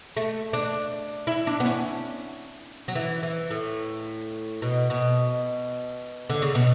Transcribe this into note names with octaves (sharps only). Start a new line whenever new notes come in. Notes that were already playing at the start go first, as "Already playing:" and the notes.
A3
D4
E4
D4
B3
C#4
F#3
E3
E3
A2
B2
B2
D3
C#3
B2